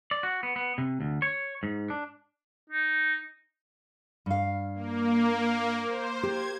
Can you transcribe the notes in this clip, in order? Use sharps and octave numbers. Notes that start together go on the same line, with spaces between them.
D5
F#4
B3
B3
C3
D2
C#5
G#2
D4
D#4
G2 F5
A#3
C5
G4 G#6